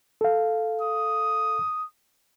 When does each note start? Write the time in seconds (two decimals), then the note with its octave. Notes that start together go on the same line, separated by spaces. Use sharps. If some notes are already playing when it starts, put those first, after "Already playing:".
0.21 A4 F5
0.81 D#6